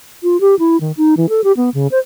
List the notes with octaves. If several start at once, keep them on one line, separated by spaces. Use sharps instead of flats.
F4
G4
E4
D#3
D#4
E3
A4
G4
B3
C#3
C5